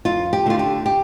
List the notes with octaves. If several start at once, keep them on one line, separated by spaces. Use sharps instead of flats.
F2 F4
G4
D3 A3 F4
G4
G4